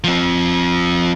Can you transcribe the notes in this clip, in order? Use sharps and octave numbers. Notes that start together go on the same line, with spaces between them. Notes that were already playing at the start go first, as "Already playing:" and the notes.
F3 C4